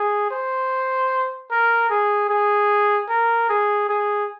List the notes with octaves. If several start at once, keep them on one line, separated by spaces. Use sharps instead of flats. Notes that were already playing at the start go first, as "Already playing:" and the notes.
Already playing: G#4
C5
A#4
G#4
G#4
A#4
G#4
G#4